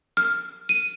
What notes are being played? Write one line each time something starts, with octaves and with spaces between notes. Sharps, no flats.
F6
D#7